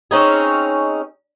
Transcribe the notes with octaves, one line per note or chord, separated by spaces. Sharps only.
C4 C#4 D#4 G#4